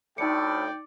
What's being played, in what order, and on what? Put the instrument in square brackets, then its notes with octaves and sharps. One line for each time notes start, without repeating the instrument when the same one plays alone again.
[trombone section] D2 A2 [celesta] D#4 C#7 [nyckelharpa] D5 [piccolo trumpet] G5